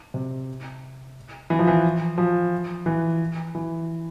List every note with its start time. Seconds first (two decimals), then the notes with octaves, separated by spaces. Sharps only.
0.14 C3
1.50 E3
1.59 F3
1.67 E3
2.18 F3
2.86 E3
3.55 E3